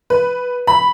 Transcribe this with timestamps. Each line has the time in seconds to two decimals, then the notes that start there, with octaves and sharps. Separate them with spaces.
0.10 B4
0.67 B5